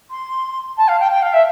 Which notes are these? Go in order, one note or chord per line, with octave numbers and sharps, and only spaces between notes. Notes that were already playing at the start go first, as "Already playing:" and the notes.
C6
A5
F5
G5
G5
F5
E5